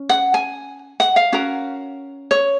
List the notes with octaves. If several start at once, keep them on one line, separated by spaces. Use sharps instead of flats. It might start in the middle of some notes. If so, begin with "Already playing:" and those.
Already playing: C#4
F#5
G#5
F#5
F5
C#4 F#4 A#4
C#5